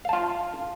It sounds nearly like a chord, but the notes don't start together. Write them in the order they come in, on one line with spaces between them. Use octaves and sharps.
F5 A5 F4